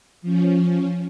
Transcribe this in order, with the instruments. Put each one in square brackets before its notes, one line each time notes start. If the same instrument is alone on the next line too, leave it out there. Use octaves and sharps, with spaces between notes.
[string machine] F3 C#4